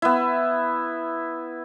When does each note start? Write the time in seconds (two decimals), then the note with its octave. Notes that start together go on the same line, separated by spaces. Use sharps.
0.02 B3 E4